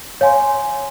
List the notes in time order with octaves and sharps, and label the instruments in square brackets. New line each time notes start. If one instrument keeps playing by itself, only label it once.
[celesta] C#5 F5 G#5 C6